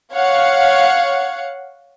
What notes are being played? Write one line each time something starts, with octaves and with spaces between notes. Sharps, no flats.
C#5 F5 F#5